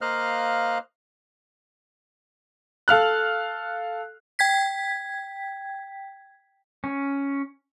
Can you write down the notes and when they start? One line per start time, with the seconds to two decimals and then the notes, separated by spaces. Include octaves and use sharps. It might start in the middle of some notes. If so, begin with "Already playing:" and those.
0.01 A#3 C5 D#5 F5 F6 F#6
2.88 A4 F5 F6 F#6
4.39 G5 G#6 B6
6.84 C#4